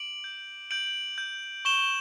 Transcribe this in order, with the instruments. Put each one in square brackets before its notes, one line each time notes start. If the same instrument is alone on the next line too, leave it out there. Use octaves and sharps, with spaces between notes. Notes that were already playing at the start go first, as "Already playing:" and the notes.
Already playing: [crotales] D6 D7 F#7
G6
G6 D7 F#7
G6
C#6 E7 G7